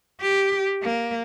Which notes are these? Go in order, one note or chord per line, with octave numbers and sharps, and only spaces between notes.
G4
A#3